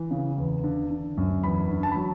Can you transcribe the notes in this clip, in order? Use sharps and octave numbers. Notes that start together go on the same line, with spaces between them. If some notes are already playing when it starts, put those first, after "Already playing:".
Already playing: E3
C#3
E2
D3
D3
F#2
E2 B5
D3
A5
B5
F#3